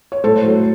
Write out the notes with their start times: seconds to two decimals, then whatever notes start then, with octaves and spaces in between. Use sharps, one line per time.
0.12 C#5
0.24 A2 A4 C5
0.44 F#3 A3